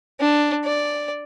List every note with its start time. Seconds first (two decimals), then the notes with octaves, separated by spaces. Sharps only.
0.20 D4
0.64 D5